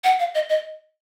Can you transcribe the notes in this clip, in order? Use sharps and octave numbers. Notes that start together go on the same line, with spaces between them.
F#5
F5
D#5
D#5